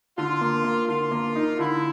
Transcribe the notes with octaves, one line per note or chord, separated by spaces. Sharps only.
D3 F4
A#3
A#3
D3 F4
A#3
D#4
D3 E4